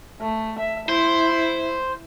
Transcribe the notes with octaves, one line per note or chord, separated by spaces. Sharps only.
A3
E5
E4 C5